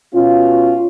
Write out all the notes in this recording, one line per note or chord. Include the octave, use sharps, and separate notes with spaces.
B2 C#4 F4